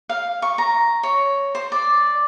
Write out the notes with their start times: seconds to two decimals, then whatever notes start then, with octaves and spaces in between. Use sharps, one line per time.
0.09 F5
0.42 C#6
0.58 A#5
1.03 C#5
1.55 C5
1.72 D5